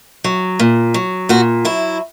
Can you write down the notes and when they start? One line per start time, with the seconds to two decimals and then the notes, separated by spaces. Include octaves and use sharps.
0.24 F#3
0.59 A#2
0.94 F#3
1.29 A#2 F#4
1.65 F#3 E4